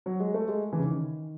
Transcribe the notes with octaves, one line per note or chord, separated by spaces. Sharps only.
F#3
G#3
A3
G#3
E3
C#3
D#3